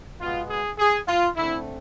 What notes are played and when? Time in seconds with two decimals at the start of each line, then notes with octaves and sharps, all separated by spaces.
0.20 B2 G#3 B3 F4
0.50 G#4
0.79 G#4
1.08 F4
1.37 D3 A3 C4 E4